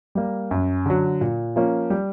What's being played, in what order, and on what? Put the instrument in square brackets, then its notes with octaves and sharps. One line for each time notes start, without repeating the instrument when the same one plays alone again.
[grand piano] G3 A#3
F#2
D3 F#3
A#2
F3 A#3 C#4
G3